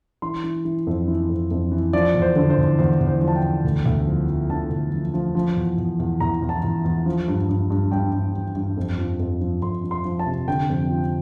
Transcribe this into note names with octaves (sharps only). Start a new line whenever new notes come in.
E3 C6
E3
E3
F2
E3
F2
F2
E3
F3 D5
E2
C5
D3
C5
E2
E2 C5
E2
C5
F3
A5
G5
E2
D2
D2
F3
F3
D3 A5
D2
F3
F3
F3
E2
E2
E2
E2 A#5
E2
A5
E2
E2
F3
G2
G2
G2
G2 G5
G2
G2
G2
F2
F3
F2
F3
F2 C6
F3
C6
F3
A5
C3
D3 G5
F2
F3